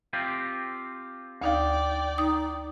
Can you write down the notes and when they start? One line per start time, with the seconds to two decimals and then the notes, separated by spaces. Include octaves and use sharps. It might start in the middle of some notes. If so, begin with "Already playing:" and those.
0.13 C4 F4 G4
1.41 D2 D#4 D5 F5 G5
2.18 D#4 D#6